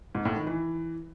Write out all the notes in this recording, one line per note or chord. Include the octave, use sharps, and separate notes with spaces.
G#2
A2
D#3
E3